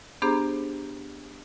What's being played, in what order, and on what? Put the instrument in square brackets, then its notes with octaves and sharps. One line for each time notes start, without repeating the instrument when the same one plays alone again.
[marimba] B3 D4 G4 G#4 C5 A#5